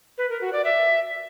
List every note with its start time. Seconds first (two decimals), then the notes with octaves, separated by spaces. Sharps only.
0.18 B4
0.29 A#4
0.41 F#4
0.53 D5
0.64 E5